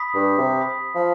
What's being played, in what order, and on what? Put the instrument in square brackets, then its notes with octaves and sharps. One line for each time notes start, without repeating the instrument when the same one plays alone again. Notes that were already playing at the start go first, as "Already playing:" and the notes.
Already playing: [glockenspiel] B5 D#6 B6
[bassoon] G2
C3
[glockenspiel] B5 D#6 B6
[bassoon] F3